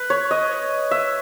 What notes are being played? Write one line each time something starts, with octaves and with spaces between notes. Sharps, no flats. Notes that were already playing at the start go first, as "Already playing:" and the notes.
Already playing: B4
C#5
D#5
E5